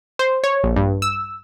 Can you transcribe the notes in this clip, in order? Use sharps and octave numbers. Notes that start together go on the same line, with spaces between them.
C5
C#5
A#1
G2
E6